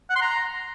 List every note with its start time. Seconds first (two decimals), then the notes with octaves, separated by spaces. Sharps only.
0.10 F#5
0.16 C6
0.22 A#5